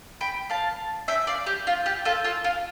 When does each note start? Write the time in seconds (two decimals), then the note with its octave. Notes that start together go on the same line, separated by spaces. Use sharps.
0.21 G5 B5
0.50 F5 A5
1.08 E5 G5
1.27 D5 F5
1.46 G4
1.67 F4
1.86 G4
2.05 F4 A4
2.24 F4 A4
2.44 F4